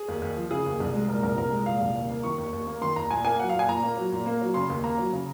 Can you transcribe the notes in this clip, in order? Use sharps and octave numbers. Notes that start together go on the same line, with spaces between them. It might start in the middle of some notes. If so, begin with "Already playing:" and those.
Already playing: G#4
D#2
D#2
F3
C#3 G#4
D#2
C2
G#3
A#2 A#4
C2 A#4
C2 A#4
G#3
A#2 F5
C2
D#2
A#3
D#3 C#6
D#2
D#2
A#3
D#3 C6
D#2 A#5
A#2 G#5
A#3 G#5
F#3 F#5
F5
A#2
G#5
A#2 A#5
A#3
F#3
A#2
A#3
F#3
C#3 C6
D#2
A#3 A#5
F#3
C#3